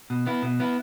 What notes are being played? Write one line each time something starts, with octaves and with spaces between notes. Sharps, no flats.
B2
B3 E4
B2
B3 E4